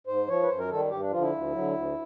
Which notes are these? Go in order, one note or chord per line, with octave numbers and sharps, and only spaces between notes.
G#2 C5
F3 C#5
B4
F#2 C5
A#4
D#3 G3 A4
G2 G4
D4
D3 F3 F4
E4
D2
D3 F#3
D2